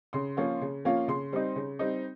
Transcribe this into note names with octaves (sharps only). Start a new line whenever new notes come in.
C#3 C6
F3 A#3 C#4 F4
C#3
F3 A#3 C#4 F4
C#3 C6
G3 C4 D#4
C#3
G3 C4 D#4